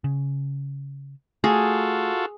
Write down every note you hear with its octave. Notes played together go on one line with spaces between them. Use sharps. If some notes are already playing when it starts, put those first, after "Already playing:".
C#3
A3 F4 F#4 G#4 A4